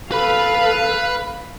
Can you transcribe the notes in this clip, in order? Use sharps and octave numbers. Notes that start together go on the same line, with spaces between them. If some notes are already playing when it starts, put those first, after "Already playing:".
A4 B4 F5 B5